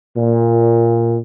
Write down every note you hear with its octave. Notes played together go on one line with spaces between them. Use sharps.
A#2